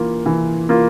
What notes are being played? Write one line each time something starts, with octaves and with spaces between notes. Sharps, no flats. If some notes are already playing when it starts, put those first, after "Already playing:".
Already playing: E3 A#3 F4
E3
A#3 F4